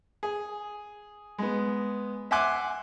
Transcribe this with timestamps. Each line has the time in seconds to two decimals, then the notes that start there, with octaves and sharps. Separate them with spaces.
0.23 G#4
1.38 G#3 B3
2.31 E5 F#5 G#5 C6 D6 F#6